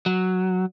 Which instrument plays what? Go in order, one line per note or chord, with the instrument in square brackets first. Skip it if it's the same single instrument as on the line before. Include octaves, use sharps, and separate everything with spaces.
[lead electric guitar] F#3